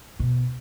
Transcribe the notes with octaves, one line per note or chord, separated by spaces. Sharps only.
B2